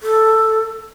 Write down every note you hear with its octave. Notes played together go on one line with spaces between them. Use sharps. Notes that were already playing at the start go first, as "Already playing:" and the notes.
A4